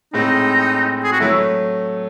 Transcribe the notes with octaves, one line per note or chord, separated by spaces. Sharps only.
A2 G#3 C4 D#4
G#4
F#4
F#3 A3 E4